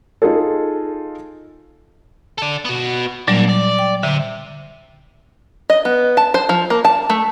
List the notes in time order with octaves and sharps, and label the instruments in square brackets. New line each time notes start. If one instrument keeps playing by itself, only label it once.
[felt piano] D#4 F4 G#4 A4
[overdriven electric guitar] A4 D5
B3 F#4
[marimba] A#2 F#3 G3 [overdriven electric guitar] A#3 D4
[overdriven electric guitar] D5
[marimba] G5
[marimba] D3 [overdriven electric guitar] C5 E5
[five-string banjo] D#5
B3
A5
C5
F3
A#3
A5
A3